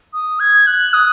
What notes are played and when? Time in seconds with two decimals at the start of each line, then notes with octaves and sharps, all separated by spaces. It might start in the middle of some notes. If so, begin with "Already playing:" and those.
0.13 D#6
0.40 G#6
0.67 F#6
0.93 D#6